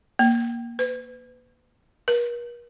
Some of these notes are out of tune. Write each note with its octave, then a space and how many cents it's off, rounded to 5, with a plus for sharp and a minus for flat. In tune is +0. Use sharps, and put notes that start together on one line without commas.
A#3 +10
B4 +30
A#4 +45